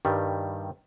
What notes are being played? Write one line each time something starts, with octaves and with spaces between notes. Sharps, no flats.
G2 D#3 G3